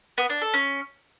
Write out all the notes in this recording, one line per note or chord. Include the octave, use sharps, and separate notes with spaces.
B3
D4
A4
C#4